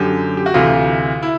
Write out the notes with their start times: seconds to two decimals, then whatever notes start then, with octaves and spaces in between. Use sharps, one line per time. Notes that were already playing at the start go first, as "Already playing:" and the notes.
Already playing: F#2 D3 G4
0.37 G4
0.46 F#4
0.54 D2 C3 E3 F4
1.23 E4